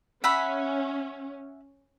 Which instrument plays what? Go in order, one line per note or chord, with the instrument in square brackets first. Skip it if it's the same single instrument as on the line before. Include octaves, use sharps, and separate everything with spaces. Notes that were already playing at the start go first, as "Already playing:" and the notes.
[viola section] C#4 [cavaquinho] E5 F#5 B5